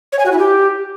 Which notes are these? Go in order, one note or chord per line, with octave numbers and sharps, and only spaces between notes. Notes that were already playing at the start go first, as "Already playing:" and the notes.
C#5
G#5
F#4
E4
G4